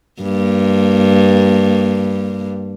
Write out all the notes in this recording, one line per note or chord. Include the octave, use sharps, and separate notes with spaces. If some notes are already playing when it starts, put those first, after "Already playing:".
G2 A#3